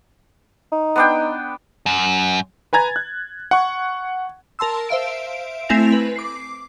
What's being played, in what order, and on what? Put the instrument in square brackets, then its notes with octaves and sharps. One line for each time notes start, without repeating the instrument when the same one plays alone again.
[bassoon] D#4
[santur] B3 D4 G5
[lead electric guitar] F#2
[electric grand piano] B4 G#5 A#5 G#6 A6
F#6
F#5 C#6
[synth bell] A#4 A5 C6 E6
C5 E5 F5 D7
A3 C4 E4 G#5 A#6 F7
B4
D6 C7